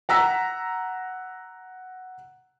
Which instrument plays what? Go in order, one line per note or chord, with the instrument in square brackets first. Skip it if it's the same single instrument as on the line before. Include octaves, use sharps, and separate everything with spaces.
[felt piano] F#5 A#5 E6 B6